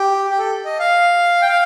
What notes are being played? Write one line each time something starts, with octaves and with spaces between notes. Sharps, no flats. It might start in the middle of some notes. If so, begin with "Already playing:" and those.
Already playing: G4
G4
A4
D#5
F5
G5
F5